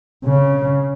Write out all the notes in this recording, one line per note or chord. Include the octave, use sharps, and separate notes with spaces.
C#3